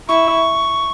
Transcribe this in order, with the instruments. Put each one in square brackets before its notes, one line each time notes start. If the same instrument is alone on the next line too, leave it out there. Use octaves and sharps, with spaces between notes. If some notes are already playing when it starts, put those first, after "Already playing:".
[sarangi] E4 [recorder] C#6